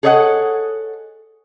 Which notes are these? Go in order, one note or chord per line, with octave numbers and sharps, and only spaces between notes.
G#4 A4 C#5 D#5 E5 F#5